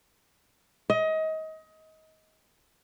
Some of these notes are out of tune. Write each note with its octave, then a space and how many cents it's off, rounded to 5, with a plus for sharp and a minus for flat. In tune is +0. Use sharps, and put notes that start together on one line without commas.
D#5 +25